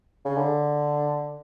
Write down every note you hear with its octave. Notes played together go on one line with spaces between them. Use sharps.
C#3
D3